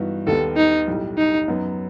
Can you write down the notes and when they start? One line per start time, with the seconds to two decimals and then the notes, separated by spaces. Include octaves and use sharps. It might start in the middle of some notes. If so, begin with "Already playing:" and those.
Already playing: G2 E3 B3 D#4 F#4
0.27 D#2 D#3 G3 B3 A4
0.57 D#4
0.88 B1 A2 G3
1.18 D#4
1.48 F#2 F#3 B3